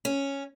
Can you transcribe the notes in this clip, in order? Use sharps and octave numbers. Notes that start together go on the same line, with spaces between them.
C#4